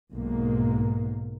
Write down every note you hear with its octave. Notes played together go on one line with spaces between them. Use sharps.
B1 G#2 A#3